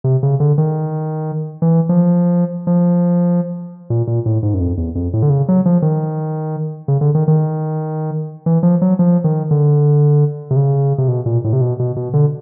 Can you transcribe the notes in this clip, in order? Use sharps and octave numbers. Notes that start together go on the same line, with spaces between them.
C3
C#3
D3
D#3
E3
F3
F3
A#2
A#2
A2
G#2
F#2
F2
E2
F2
A2
D3
C#3
F#3
F3
D#3
C#3
D3
D#3
D#3
E3
F3
F#3
F3
D#3
D3
C3
C#3
C3
B2
A#2
A2
C3
B2
B2
B2
D3